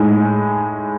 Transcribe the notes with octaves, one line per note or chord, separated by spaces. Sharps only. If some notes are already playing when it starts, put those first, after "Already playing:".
Already playing: A2 G#3 D#4 G#4